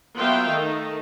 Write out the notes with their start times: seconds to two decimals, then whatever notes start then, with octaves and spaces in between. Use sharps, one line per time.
0.17 F#3 B3 F4 E5 F5 G5
0.49 D#3 A3 D#4